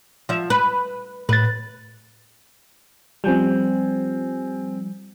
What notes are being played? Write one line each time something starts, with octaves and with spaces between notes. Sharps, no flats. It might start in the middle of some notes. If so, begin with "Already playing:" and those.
F3 E5
B4
A2 B4 A6
F3 G3 C4 G#5 G6